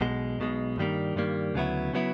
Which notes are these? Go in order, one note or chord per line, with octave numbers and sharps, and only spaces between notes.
B1 B2 G#3
B1 B2 G#3
G2 D#3 G3 A#3
G2 D#3 G3 A#3
D2 C#3 F#3 B3 E4
C#3 F#3 B3 E4